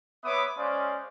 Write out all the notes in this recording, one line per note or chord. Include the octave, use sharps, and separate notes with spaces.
B3 B4 C#5 E5 D6 D#6
G#3 C#4 C5 D5 F5 D#6